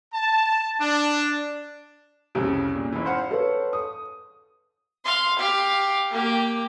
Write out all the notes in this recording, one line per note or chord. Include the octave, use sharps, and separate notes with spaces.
A5
D4
C2 F2 C#3 C#4 G4
A#2
G#1 E3
C5 F5 F#5
A4 B4 C#5
D#6
F5 C6
G4 F5
A#3 G4